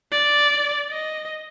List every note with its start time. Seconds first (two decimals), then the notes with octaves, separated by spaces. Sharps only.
0.12 D5
0.90 D#5